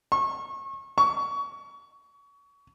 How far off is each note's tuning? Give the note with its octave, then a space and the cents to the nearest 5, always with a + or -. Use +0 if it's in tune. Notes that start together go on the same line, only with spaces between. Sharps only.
C#6 -35
C#6 +25